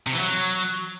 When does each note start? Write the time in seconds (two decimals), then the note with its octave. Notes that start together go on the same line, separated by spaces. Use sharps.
0.07 C3
0.13 E3
0.19 F#3